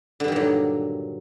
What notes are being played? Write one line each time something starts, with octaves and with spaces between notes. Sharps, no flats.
G2 A#2 D3 D#3 F#3